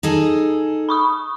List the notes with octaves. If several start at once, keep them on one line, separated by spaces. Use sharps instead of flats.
D#4 G#4 A4
B5 C#6 D#6